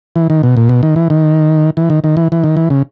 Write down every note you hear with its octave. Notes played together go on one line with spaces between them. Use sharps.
E3
D#3
B2
A#2
B2
D#3
E3
D#3
E3
D#3
D#3
E3
E3
D#3
E3
C#3